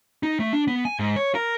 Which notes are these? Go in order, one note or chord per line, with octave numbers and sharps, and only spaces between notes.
D#4
A3
D4
B3
G#5
G#2
C#5
A#4